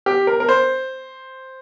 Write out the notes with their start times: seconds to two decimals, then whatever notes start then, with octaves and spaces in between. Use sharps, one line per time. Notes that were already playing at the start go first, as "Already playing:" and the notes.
0.06 G4
0.27 A#4
0.40 A#4
0.49 C5